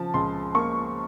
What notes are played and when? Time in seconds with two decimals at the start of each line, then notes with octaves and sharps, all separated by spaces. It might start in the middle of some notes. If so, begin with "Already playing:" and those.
Already playing: C#3 F3 A5
0.14 C#2 C6
0.54 A#3 C#6